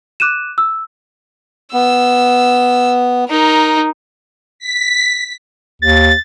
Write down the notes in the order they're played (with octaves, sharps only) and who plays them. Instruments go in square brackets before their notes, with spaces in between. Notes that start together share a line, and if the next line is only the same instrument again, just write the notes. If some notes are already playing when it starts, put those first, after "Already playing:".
[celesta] D6 F#6 D#7 E7
E6
[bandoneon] B3 [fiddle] E6
[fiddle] D#4 A#4
[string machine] B6
[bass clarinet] D#2 [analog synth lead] A6